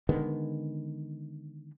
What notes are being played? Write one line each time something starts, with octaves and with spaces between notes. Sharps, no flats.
D3 D#3 G#3 B3